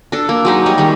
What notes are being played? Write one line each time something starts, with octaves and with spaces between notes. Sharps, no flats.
D4 A4
A#3
F#3 G#3 D#4
G3 C#5 D#5
D#3 G3